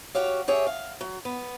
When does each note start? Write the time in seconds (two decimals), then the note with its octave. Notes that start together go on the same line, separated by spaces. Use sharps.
0.15 F#4 G4 C#5 F5
0.48 G4 G#4 C#5 E5
0.67 F5
1.01 F#3
1.25 B3